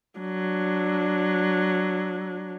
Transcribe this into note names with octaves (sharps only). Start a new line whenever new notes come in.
F#3 D4